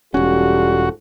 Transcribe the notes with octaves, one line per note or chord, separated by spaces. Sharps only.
E1 G#2 G3 C#4 F4 F#4 A4